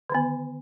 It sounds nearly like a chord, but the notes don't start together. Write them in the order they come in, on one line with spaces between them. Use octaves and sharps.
D3 D#3 B3